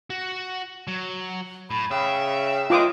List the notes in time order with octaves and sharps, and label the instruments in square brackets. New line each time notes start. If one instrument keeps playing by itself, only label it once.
[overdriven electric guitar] F#4
F#3
[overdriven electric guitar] A2 [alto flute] B5
[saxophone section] C#3 [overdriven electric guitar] E5 [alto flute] G5
[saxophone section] E3 G#3 [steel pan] F4 D6 D#6